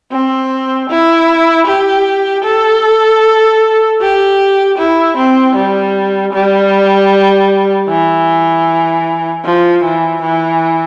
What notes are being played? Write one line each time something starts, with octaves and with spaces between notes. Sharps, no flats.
C4
E4
G4
A4
G4
E4
C4
G3
G3
E3
F3
E3
E3